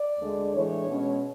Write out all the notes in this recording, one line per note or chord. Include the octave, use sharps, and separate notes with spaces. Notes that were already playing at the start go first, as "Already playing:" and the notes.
Already playing: D5
D2 D3 G#3
A2 E3 G#3 D4 C#5
B2 G#3 C#4